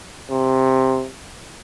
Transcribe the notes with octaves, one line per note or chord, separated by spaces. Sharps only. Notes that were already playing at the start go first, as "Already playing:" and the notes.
C3